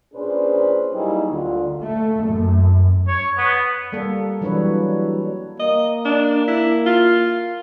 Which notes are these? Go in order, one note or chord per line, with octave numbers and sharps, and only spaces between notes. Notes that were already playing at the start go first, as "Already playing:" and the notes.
A#2 C#4 D4 G#4 B4 C5
F#3 G3 A#3 D#4 E4 G#4
D2 D3 F4
A3
F#2
C#5
B3
G3 A#3 A4
E3 F#3 G3 D4 B4 C#5
A#3 D#5
D4
E4
F4